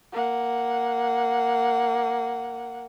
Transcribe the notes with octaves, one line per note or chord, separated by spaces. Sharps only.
A#3 F#5